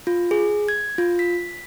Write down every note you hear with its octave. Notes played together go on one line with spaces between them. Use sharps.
F4
G#4
G#6
F4
B6